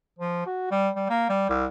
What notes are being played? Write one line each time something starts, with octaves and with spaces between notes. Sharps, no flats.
F3
F#4
G3
G3
A#3
G3
C2